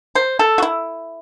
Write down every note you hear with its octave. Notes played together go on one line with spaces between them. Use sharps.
C5
A4
F#4
E4